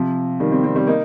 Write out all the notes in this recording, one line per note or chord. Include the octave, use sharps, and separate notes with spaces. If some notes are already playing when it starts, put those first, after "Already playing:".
Already playing: C3 F3
D#3 G3
G3 C4
G3 C4
G3 C4
A#3 D#4